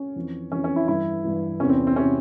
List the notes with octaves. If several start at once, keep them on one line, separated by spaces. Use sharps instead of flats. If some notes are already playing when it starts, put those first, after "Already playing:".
Already playing: C#4
F2 E3
F2 E3 C#4
C#4
E4
G2 E3 E4
G2 E3
E2 C3 E3 C#4
C4
C4
C3 E3 C#4